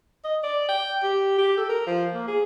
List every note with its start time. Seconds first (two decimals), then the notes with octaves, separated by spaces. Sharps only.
0.25 D#5
0.43 D5
0.69 G5
1.03 G4
1.38 G4
1.57 A4
1.69 A#4
1.87 F3
2.14 A#3
2.27 G#4